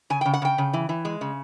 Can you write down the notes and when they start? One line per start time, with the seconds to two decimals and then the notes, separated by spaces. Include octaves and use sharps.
0.10 C#3 G#5
0.21 C#3 G5
0.33 F#5
0.42 C#3 G5
0.58 C#3
0.73 E3
0.89 E3
1.05 G#3
1.21 C#3